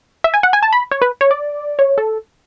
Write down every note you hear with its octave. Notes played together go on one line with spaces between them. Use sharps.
E5
G#5
F#5
G#5
A5
B5
C#5
B4
C#5
D5
C#5
A4